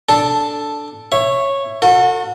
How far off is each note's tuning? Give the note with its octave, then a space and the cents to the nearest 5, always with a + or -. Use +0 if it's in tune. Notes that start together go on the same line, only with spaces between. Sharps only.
D4 +0 A4 +0 A5 +0
C#5 -10 E5 +15
F#4 -30 A4 +35